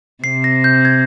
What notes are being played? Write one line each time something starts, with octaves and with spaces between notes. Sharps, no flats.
C3 C4 C7
A#6
G6
G#6